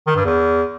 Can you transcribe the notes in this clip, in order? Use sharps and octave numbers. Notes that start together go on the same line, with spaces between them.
D#3
G2
E2